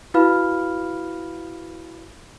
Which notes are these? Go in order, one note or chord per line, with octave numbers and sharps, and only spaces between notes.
E4 F#4 B4 F5 B5 F6